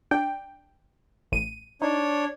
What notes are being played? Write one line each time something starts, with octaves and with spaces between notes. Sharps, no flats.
D4 G5
A1 D#7
D4 D#4 C#5